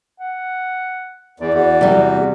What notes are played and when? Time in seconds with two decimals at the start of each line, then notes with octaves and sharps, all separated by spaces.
0.20 F#5
1.40 E2 D5
1.54 E2 F#4
1.81 C3 G3